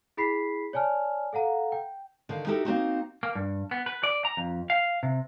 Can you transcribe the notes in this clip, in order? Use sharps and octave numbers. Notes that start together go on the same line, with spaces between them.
E4 G#4 B5 B6 C7
C#5 D5 G#5 A5 F6
A4 F5 F#5 A#5
G5
D3 D#3 F5
D#4 E4 F#4 G4 A4 A#4
A#3 C4 D#4 F#4
A#3
G2
B3
B4
D5
A#5
F2
F5
C3